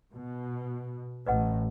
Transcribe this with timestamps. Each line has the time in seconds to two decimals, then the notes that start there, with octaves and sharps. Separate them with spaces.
0.12 B2
1.27 A1 A2 B4 D#5 F#5